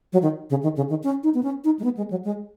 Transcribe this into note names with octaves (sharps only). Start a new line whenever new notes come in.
F#3
D#3
C#3
D#3
C#3
D#3
C#4
D#4
B3
C#4
D#4
G#3
B3
G#3
F#3
G#3